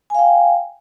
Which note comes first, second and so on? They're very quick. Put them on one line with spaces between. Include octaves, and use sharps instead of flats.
G#5 F5 G5